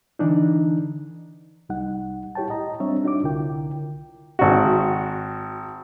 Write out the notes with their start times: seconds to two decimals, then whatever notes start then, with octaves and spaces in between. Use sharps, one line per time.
0.19 D3 E3 D4 D#4
1.69 C2 G3 D#4 F#5
2.35 E4 G4 C#5 G5 A5
2.49 A2 D#5 A#5
2.80 G3 C4 D4 C#5 E5
3.04 D4 D#4 F#4 C#5 E5 D6
3.24 C2 D3 E4 F4 A#4 G5
4.39 G#1 F#4